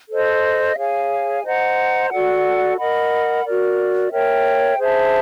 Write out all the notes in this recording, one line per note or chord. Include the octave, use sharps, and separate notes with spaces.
A4 C5 D#5
G#4 C#5 F5 G#5
C5 D#5 F#5 A#5
F#4 A4 D5 F#5
A#4 D#5 F#5 B5
F#4 A#4 D5
A#4 C#5 E5 G5
G#4 C5 E5 A5